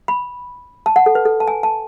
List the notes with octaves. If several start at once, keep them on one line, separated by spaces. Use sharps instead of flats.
B5
A5
F#5
A4
B4
A4
A5
G#5
A5